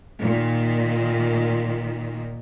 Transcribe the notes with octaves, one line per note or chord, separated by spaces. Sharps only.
A#2 D#3